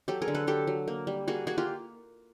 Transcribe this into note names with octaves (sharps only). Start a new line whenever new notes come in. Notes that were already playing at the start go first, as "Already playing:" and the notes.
F#3 G4 A4
G#4 A#4
D3
A4 B4
F#3 G4 A4
F#3
A#3
G3
A#3 F#4 G#4
A#3 F#4 G#4
F4 G4